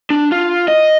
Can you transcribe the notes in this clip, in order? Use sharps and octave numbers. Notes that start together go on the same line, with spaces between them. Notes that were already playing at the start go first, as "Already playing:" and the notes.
D4
F4
D#5